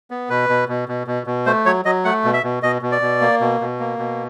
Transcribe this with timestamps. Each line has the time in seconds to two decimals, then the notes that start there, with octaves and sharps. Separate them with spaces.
0.11 B3
0.30 B2 B4
0.49 B2
0.69 B2
0.89 B2
1.07 B2
1.27 B2
1.46 A3 C5
1.66 F#3 C#5
1.85 F#3 D#5
2.05 A3 F#5
2.24 B2
2.33 E5
2.44 B2
2.63 B2 D#5
2.82 B2
2.92 D5
3.02 B2
3.21 A#3
3.41 B2
3.61 B2
3.80 A#3
3.99 B2